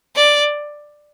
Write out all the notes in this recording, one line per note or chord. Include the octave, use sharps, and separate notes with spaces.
D5